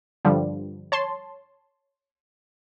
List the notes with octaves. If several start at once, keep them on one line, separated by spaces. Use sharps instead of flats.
G2 D3 F3 G3
C#5 A5 C6